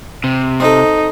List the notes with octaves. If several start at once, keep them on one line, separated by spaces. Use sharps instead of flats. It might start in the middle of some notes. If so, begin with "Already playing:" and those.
C3
C4 D#4 A4